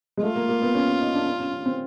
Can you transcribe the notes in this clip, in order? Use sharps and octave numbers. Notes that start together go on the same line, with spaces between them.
G#3
A3 F4
A#3
A#3
B3
C#4
C#4
D#4
D4
D4
C#4
C#4
C4